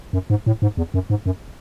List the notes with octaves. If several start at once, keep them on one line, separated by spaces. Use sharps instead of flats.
F#2
G#2
A2
G#2
E2
F#2
G#2
F#2